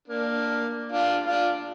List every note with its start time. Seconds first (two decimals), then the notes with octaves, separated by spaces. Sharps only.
0.08 A#3 D4
0.92 D4 F4
1.26 D4 F4